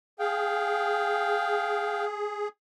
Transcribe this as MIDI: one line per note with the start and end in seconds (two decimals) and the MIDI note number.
0.19 2.48 68
0.19 2.05 77
0.19 2.05 79